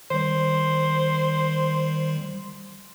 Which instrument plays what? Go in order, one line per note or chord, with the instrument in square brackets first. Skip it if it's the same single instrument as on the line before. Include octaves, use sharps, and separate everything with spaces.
[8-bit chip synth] D#3 G3 [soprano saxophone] C5